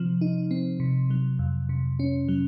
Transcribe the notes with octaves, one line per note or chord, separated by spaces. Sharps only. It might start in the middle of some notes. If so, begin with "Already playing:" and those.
Already playing: C3 F3 C4
D#4
C4
C3
F#3
F2
C3
C#4
F#3